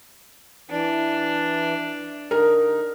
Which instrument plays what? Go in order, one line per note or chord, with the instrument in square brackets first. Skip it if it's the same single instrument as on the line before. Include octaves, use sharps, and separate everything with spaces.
[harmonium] E3 [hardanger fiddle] D4
[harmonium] D3 D#4 [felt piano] A#4